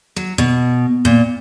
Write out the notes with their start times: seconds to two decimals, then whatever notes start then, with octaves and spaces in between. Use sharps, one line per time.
0.16 F#3
0.38 B2
1.05 A#2